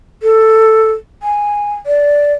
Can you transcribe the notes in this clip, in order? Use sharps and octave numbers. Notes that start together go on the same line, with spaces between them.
A4
G#5
D5